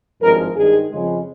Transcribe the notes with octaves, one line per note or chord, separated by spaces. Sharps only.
G#1 G2 F3 G#3 A#4
G2 D#3 G#3 G#4
F2 C#3 G#3